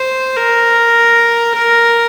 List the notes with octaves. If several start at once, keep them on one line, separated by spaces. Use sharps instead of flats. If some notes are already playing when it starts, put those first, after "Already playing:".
Already playing: C5
A#4